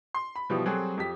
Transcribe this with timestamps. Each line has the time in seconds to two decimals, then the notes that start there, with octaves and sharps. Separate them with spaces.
0.15 C6
0.36 B5
0.50 B2 E3 F3 G3
0.66 F#3 G3 C4 F#4 G#4 A4
0.97 F2 G4 B6